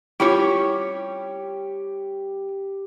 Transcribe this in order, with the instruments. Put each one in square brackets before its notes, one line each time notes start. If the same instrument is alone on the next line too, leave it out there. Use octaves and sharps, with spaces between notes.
[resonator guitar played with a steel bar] G3 C#4 C#5 [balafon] E4 F4 [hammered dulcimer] G4